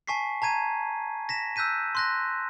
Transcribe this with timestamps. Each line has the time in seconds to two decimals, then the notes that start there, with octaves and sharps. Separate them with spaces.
0.07 G#5 A5 C#6 B6 C7
0.42 A5 A#5 G#6 D#7
1.29 A#6 B6 E7
1.56 E6 F#6 G6 B6 D#7
1.95 C6 F#6 A#6